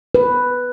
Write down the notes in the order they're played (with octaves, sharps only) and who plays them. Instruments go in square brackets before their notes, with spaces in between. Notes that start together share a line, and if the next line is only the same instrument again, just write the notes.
[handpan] B4